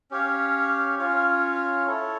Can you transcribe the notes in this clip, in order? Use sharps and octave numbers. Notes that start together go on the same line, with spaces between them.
C#4 G4 C#5 F5
C#4 F4 C#5 F5
E4 A4 C#5